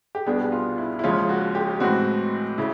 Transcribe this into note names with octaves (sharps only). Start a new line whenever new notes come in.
G4
C2 B2 G3 B3 D4 G#4
F4
E4
E4
D#2 C#3 F3 G#3 C#4 F4
F#4
G4
A2 E3 G#3 C4 F#4
C#3 E4